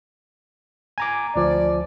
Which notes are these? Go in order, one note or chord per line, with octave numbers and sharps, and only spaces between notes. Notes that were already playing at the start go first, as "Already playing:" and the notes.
G#5 A#5 D6
D2 F3 D5